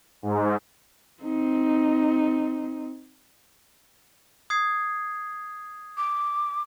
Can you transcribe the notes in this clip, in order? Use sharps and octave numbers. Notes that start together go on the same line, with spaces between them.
G#2
C4 D#4
D#6 G#6 C7
D6